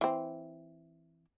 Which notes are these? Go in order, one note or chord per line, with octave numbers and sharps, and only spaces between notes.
E3 C4